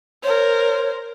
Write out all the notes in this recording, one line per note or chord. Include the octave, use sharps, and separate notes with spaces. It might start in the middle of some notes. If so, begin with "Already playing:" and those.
A#4 C5 C#5